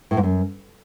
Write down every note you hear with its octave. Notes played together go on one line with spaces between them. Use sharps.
A2
G#2
F#2